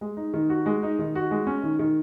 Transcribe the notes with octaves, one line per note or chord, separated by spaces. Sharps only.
G#3
D#4
D#3
F#4
G#3
D#4
D#3
F#4
G#3
C#4
D#3
D#3